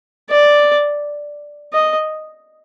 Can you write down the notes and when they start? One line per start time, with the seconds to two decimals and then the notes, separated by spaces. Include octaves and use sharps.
0.30 D5
1.73 D#5